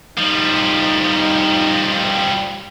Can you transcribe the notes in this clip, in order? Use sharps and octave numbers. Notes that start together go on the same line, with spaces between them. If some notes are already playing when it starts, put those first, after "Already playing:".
F3 G3 D#4